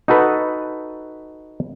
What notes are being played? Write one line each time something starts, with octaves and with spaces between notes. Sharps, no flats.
D#4 F#4 A4 B4